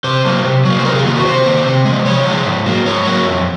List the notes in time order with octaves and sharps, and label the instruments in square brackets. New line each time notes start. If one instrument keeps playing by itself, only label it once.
[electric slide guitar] C3 C5
F#3 A#3
C3
F#3 A#3
C5
C3 A#4
G#4
D#3 A#3 F4
F#4
C3 C5
D#3 A#3
C3
G#3
F3
C3 C#5
F3 G#3
G#2
F#3 A#3
G#2 C#5
F#3 A#3
F2